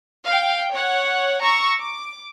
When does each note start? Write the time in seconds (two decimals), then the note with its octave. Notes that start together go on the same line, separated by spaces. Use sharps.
0.24 F5 G5
0.72 C#5 F#5
1.42 A#5 C#6 E6
1.79 D6